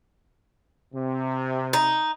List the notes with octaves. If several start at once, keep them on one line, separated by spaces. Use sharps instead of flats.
C3
D#4